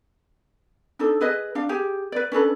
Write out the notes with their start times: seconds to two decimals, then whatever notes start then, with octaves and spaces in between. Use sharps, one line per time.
0.99 D4 D#4 A4
1.21 G#4 B4 D#5
1.55 D4 F5
1.69 G4 G#4
2.12 B4 D5
2.32 C#4 D4 A4 B4